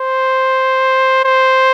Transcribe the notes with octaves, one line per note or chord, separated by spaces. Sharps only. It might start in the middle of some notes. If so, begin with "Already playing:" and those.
Already playing: C5
C5